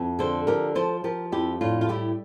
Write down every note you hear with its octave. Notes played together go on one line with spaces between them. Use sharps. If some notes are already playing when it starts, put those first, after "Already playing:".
Already playing: F2
D3 A4 C5
F3 G4 A#4
F3 A4 C5
F3 G4 A#4
F2 E4 G4
A2 D4 F4
F4
G3 E4 G4